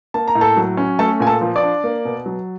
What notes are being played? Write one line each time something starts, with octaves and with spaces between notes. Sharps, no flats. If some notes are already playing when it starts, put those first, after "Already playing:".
A#3 A5
A#5
A2
A4 A5
F#3
C#4
A3 A4 A5
A#2 G#5
A4 A5
F3
D5 D6
D4
A#3
B2
F#3